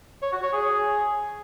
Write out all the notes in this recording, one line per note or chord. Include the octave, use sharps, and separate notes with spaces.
C#5
F#4
C#5
G#4